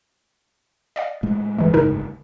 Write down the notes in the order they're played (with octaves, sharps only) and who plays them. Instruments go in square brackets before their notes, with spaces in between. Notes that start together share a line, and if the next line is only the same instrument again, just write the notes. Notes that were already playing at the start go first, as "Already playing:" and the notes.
[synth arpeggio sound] D5 D#5 F5
[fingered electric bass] A2 G#3 A3
[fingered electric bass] F#1 D2 G#2 [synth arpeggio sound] E3 G#3
[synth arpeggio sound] C#3 D#4 A#4